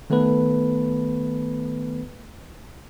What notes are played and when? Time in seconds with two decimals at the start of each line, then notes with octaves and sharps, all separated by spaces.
0.10 D#3 A3 B3 A4 B4